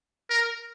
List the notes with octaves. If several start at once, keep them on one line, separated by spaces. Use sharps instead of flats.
A#4